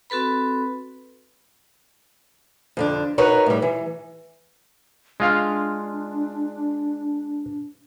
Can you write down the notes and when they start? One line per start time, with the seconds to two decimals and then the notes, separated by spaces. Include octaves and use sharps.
0.10 C4 F#4 A4 B4 B5
2.77 F2 D3 D4
3.18 D#4 F#4 A#4 B4 C#5
3.46 A2 G3
3.62 E3
5.20 G#3 D4 F4 F5